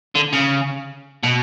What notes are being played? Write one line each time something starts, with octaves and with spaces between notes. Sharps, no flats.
D3
C#3
B2